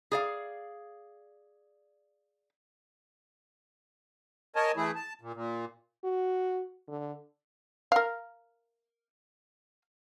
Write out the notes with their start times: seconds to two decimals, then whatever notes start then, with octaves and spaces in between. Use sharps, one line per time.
0.12 G#4 D5 F5
4.56 A#4 C#5 D#5 G#5 A5
4.77 E3 A3 E4 G#4
4.95 A5
5.21 A#2
5.34 A#2
6.04 F#4
6.88 D3
7.92 A#4 F5